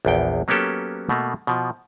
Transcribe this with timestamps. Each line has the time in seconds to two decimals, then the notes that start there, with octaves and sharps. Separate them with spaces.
0.05 A#1 E2 G5
0.48 F#3 A#3 B3 C#4 G4 A4
1.09 B2 A3 A#3
1.47 B2 F3